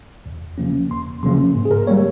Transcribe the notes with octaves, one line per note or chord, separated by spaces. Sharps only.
E2
C#3 F3 A#3 C#4
E2 C6
C#3 F3 A#3 C#4 C6
G#2
G#4
A#4
G3 A#3 C#5